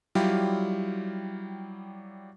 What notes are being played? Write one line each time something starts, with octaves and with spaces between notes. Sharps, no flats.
F#3 G3 E4 F4 G4